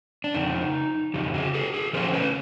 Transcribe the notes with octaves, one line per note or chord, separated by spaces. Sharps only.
D4
F2 C#3 D#4
F2 C#3 G4
F#4 G#4
G4 A4
G#4 A#4
C#3 F3 A3 C#4 A#4 C5
B4 C#5